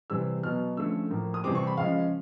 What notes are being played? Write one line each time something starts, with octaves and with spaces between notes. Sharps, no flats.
C3 E3 G3 C4 E6
B2 F#3 B3 F6
D3 F3 A3 C#4 E6
A2 F3 A#3
D#6
C3 E3 G3 C4 D6
C#6
B5
C#3 F3 G#3 C#4 F5